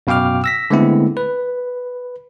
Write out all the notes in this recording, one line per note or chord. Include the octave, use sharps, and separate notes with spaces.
F#2 B2 F5 G5 D6 F6
E6 A#6 B6
D3 G#3 A3 B3 C4 E4
B4